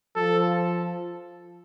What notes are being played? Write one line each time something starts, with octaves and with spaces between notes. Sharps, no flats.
F3 A4